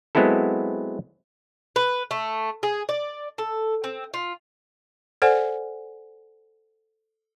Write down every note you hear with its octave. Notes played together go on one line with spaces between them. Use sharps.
F#3 G#3 B3 C4 E4 A4
B4
A3
G#4
D5
A4
C4
F4
A4 C5 D5 F#5 G#5